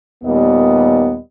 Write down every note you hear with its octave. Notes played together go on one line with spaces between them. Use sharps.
D#2 A#2 G3 B3 D#5